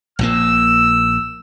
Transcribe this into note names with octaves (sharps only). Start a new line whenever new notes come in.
A#1 A#2 A#3 E6